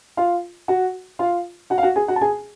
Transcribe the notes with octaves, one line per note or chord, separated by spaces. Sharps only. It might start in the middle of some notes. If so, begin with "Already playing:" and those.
F4 F5
F#4 F#5
F4 F5
F#4 F#5
F5
F#4 F#5
G#4 G#5
F#4 F#5
A5
G#4 G#5